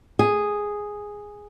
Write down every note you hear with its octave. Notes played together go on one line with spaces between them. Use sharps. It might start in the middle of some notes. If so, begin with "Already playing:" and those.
G#4